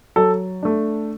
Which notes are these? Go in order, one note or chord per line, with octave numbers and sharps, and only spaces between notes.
F#3 A4
A3 D4